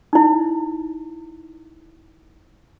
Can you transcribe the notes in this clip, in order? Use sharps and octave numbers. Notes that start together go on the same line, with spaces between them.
D#4 E4